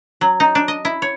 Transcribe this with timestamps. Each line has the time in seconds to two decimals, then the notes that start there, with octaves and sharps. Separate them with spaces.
0.21 F#3
0.40 D#4
0.55 D4
0.68 D#5
0.85 E4
1.02 C#5